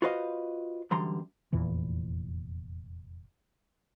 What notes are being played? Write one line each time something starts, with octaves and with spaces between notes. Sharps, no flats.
F4 F#4 B4 C5 D#5 F5
F#2 D3 E3 G3 A#5 C6
F1 E2 A#2 E3